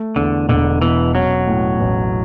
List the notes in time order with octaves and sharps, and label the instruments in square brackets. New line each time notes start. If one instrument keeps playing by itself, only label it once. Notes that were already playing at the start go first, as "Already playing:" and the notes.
Already playing: [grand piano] A3
[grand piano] E2 [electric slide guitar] D3
[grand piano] E1 [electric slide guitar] D3
[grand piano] B2 [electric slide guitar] E3
[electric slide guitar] F#3 [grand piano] C#4
[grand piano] A2
A1